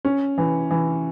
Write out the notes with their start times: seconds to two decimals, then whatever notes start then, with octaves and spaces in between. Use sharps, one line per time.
0.05 C#4
0.38 E3
0.70 E3